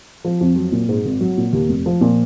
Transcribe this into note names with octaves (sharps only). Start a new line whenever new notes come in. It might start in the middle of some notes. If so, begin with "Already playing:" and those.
F3
F2
F#3
A#2
G#2
G#1
F#3
A#2
D#2
F1
F3
A#2